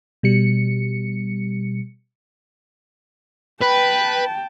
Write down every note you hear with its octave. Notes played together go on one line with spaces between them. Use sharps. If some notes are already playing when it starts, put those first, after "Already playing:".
B2 G3 C#7
B4 G5 A5